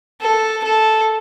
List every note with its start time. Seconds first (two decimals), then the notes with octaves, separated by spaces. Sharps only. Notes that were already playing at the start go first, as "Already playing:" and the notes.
0.21 A4
0.64 A4